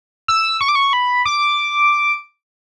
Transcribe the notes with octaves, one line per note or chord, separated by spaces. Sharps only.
E6
C#6
D6
C#6
B5
D6